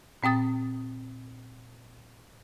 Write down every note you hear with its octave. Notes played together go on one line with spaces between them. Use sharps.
A#2 C4 G5 D#6 A6